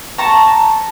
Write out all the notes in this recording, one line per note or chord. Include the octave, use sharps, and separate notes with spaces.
A5 A#5 C#6